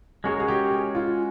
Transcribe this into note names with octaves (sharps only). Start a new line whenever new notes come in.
G#3 C#4 F#4 G#4 A#4 C#5
G#4
G4
G#4
F4